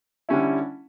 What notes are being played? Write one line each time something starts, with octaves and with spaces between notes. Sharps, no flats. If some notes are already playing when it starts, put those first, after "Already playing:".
D3 G3 C#4 E4